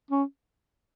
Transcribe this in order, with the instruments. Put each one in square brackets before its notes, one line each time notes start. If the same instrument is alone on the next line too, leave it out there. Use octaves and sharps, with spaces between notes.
[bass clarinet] C#4